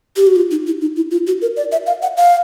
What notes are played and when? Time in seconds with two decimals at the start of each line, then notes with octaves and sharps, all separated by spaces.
0.16 G4
0.27 F#4
0.36 F4
0.51 D#4
0.66 E4
0.81 D#4
0.96 E4
1.11 F4
1.27 F#4
1.42 A#4
1.57 D5
1.72 E5
1.87 F5
2.02 F#5
2.17 F5